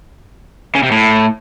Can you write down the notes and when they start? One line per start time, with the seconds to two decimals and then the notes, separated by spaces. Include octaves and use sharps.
0.75 C#3
0.83 C3
0.91 A2